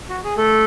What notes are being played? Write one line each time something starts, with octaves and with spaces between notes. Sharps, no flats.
F#4
G#4
A3 A4